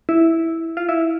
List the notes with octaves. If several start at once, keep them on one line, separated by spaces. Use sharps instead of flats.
E4
F4
E4